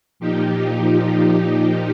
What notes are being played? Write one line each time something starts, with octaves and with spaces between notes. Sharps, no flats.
A#2 F3 D#4 G4